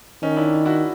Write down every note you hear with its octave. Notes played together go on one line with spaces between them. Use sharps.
D#3 C#4 D#4
D4 E4
E4 F#4